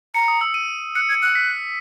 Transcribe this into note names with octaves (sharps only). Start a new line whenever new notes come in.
A#5 C#7
D#6
E6
D#7
F#6 C#7
G#6
C#7
F#6
B6